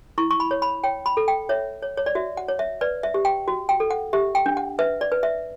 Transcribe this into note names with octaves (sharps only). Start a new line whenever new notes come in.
E4 C#6
C#6
B5
C#5
B5
C#5 G5
B5
A4
G5
C#5 E5
C#5
C#5
D5
F#4 E5
F#5
C#5
E5
B4 D5
E5
G4
G5
F#4
G5
A4
F#5
G4 E5
G5
D4
F#5
B4 E5
D5
B4
E5